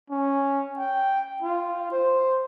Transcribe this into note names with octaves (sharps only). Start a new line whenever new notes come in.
C#4
G5
F4
C5